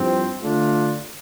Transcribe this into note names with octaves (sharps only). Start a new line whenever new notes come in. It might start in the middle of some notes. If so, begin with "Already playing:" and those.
Already playing: G2 F3 C4 E4
D3 A3 D4 F4